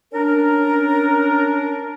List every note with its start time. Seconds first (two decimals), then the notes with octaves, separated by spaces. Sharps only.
0.13 C#4 D4 A#4